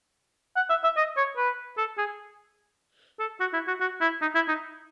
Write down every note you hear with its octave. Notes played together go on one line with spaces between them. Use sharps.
F#5
E5
E5
D#5
C#5
B4
A4
G#4
A4
F#4
E4
F#4
F#4
E4
D#4
E4
D#4